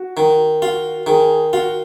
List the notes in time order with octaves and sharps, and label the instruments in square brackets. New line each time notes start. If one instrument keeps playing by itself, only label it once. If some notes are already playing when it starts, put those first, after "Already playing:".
Already playing: [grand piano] F#4
[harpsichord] D#3
[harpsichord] F4 [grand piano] F#4
[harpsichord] D#3 [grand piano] G#4
[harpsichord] F4 [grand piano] F#4